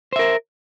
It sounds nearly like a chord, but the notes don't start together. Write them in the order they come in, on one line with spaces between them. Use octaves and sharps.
C5 E5 A#4